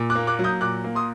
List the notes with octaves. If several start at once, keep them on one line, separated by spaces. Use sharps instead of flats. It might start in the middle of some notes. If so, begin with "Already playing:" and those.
Already playing: A#2
D6 F#6
A#3
D6 F#6
F#3
D#6 G6
A#2 D6 F#6
A#3
C6 D#6